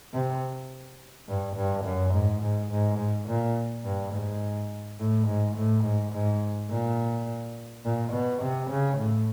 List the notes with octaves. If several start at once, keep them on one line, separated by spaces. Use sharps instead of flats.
C3
G2
G2
F#2
G#2
G#2
G#2
G#2
A#2
G2
G#2
A2
G#2
A2
G#2
G#2
A#2
A#2
B2
C3
C#3
A2